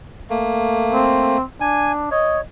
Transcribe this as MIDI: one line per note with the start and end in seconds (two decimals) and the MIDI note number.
0.30 1.38 57
0.30 1.38 58
0.93 1.44 60
1.61 2.09 62
1.61 1.92 80
2.11 2.41 73
2.11 2.38 75